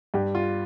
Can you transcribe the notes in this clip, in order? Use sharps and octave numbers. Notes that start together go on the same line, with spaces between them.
G2 G4
F4